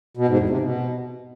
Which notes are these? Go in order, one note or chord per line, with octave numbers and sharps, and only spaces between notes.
B2
G#2
E2
C3
B2